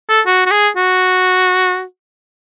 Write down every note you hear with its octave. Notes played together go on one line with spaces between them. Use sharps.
A4
F#4
F#4
G#4
F#4